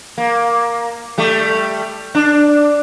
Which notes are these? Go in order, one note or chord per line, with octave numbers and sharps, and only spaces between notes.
A#3
G3 A3
D4